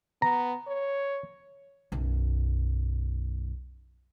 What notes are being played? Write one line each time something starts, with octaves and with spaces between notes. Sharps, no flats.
B3 A#5
C#5
B1 F#2